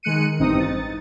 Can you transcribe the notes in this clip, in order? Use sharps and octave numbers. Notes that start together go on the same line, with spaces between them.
D#3 G#3 F#6 C#7 D#7
A1 G2 E3 C4 D#4 D#6
A6